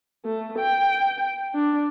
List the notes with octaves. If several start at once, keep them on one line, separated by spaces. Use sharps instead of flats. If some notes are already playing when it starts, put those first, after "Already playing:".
A3
G5
D4